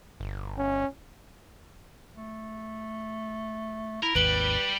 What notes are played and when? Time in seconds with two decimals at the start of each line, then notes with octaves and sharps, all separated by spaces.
0.20 G1
0.58 C#4
2.16 A3
4.03 E4 A#4
4.15 G#1 D#2 G3 B4 D7 F#7 G7